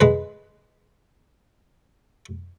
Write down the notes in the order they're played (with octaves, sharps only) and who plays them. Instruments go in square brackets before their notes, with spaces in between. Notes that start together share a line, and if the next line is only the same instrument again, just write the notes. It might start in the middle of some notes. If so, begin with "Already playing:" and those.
[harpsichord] G#3 B4